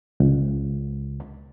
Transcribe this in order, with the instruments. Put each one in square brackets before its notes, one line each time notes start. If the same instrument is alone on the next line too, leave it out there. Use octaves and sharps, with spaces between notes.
[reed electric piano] C#2